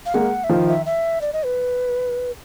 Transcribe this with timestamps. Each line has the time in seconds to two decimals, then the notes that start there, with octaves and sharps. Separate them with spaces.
0.06 F5
0.14 G#3 A#3 F#5
0.44 E5
0.49 D#3 F3 F5
0.68 E5
0.86 E5
1.21 D5
1.33 D#5
1.45 B4